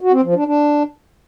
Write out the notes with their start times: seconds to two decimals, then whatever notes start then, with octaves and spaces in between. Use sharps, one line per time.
0.01 F#4
0.12 C4
0.24 F3
0.35 D4
0.47 D4